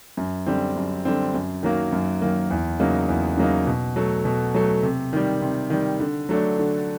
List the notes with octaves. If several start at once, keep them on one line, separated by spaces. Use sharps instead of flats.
F#2
D3 G3 C4
F#2
D3 G3 C4
F#2
D#3 F#3 A#3
F#2
D#3 F#3 A#3
E2
C#3 F#3 A#3 D#4
E2
C#3 F#3 A#3 D#4
B2
F#3 A3
B2
F#3 A3
C3
D#3 G3
C3
D#3 G3
D3
F#3 A3 D4
D3